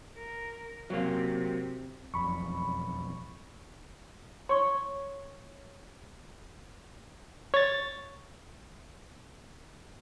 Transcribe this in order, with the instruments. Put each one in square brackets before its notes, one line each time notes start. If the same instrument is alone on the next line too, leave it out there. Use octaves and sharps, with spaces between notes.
[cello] A#4
[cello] C3 [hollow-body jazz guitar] F#3 A#3
[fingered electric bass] E1 B1 F2 [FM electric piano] B5 C#6
[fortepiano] C#5 [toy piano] C6 C#6
[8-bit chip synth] C#5 A6